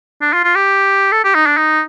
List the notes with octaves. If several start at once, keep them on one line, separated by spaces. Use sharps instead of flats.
D4
F4
F4
G4
A4
G4
D#4
D4
D#4